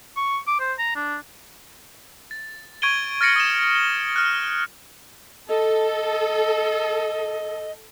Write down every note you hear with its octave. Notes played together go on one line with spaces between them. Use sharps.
C#6
D6
C5
A#5
D4
A6
C#6 G#6 D7 D#7 G7
F6 A6 A#6 C#7 D7 F#7
D#6 E7
G7
F6 F#6
A4 D#5